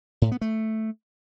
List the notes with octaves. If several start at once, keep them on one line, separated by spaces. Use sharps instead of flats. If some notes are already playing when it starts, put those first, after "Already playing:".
A2
B3
A3